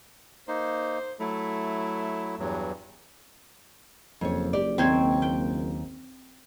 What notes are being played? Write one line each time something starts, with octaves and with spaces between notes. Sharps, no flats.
A#3 D#4 C5
F#3 A3 E4
E2 G2 F#3
F#1 F2 C#5
F#1 G4 D5
D#2 B3 C4 C5 C#5
G5